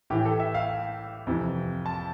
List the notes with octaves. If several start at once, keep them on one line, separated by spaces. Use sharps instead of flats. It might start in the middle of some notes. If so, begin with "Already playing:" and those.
A2 E3 G4
A4
E5
F5
F2 C3 E3
A5